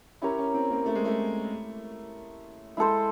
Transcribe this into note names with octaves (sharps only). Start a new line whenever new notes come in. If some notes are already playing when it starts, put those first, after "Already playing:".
C#4 E4 G4 A#4 C#5
C#4
C4
A#3
A3
G#3
A3
G#3 E4 A4 C5